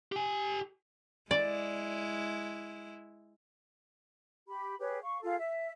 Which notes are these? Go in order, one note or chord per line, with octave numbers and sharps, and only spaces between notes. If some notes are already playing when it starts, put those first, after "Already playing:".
G4 G#5
G#3 E4 D5
G4 B5
G4 G#4 B4 C#5
F5 C#6
F4 G#4 A4 F5
E5